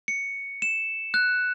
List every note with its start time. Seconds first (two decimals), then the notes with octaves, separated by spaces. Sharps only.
0.08 C#7
0.62 E7
1.14 F#6